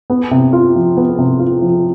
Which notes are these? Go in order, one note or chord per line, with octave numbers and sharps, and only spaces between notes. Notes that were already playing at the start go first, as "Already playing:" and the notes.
B3
C3
F4
F3
B3
C3
F4
F3